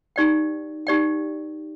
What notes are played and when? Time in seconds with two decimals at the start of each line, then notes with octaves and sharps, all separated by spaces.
0.16 D#4 G4 D5 G5
0.87 D#4 G4 D5 G5